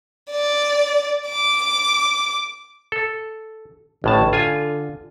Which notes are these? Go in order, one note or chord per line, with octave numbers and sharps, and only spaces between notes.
D5
D6
A4
A1 A2 D3 A5
F4 G#5